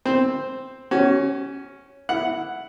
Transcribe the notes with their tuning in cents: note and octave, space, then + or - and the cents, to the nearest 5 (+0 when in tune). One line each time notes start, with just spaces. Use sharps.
C4 +0 C5 +0
C#4 +0 F#4 +45
E4 +0 F#5 +0